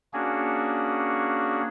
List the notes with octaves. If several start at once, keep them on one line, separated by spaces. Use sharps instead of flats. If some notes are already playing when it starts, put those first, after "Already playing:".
A#3 C#4 D4 F#4 G#4